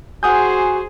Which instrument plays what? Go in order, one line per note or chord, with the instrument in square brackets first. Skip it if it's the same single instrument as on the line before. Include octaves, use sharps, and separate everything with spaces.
[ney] F#4 [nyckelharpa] G#4 C5 [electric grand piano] F#5 D#6 G6 [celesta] G#5